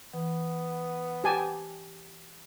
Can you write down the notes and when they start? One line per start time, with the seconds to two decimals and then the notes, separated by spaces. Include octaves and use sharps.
0.14 E3 B3
1.24 G4 G#5 A5